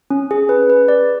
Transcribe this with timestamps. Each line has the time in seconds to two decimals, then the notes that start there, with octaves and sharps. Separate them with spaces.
0.10 C#4
0.31 G#4
0.49 B4
0.70 B4
0.88 D5